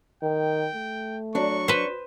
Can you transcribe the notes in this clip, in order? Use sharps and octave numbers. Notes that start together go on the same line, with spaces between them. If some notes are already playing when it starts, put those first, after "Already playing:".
D#3 G5
A3
F#3 D4 C#6
B4 C5